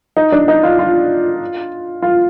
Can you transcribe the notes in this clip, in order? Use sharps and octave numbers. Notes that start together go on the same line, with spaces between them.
D#4
D4
D#4
F4
F4
F4